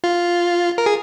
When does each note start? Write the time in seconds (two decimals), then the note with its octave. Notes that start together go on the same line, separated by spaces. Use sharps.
0.04 F4
0.78 A#4
0.86 G#4